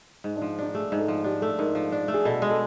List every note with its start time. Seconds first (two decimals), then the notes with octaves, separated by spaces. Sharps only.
0.24 G#2
0.36 D4
0.42 F3
0.59 D4 D#4
0.74 A3 G#4
0.92 G#2
0.99 A4
1.08 F3
1.24 D4 G4
1.41 A3 A4
1.59 G#2 A#4
1.75 F3
1.92 D4
2.08 A3
2.14 G#4
2.25 B2 A4
2.42 G#3
2.50 A4